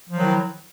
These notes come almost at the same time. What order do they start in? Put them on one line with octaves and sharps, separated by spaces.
F3 F#3 D#3 E4